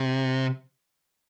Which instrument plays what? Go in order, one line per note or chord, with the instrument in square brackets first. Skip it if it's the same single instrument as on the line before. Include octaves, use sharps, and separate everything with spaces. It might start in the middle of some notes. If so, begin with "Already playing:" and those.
Already playing: [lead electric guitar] C3